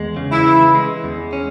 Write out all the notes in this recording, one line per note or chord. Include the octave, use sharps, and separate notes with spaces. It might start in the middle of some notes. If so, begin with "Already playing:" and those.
Already playing: E2 G#3
C#3
E4
E3
G#3
E2
C#4